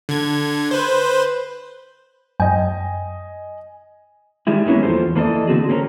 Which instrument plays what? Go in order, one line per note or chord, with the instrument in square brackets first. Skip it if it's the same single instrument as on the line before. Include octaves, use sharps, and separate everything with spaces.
[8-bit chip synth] D3 G#6
B4 C5
[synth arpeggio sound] F#2 G5 [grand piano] D#5 G#5
[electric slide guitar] D#3 G3 G#3 E4
G#3 A#3 B3 C#4 E4
E2 F3 F#3 G#4 A4 C5
E3 A#3 A4 D5 D#5
D3 C4 F#4 G#4
A#3 C4 C#4 F#4 A#4